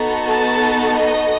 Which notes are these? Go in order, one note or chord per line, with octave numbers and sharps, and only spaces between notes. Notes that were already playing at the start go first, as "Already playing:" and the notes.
Already playing: B3 D#4 F#4 A4
A5
D#5